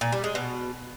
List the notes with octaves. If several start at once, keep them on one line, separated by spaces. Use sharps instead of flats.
A#2
G3
G#3
B2